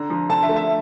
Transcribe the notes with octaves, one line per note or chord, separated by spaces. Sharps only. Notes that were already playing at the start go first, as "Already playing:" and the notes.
Already playing: D3 A#5
F3
D3 A5
E5
A3
E5